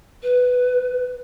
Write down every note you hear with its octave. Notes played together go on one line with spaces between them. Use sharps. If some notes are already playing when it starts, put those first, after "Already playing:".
B4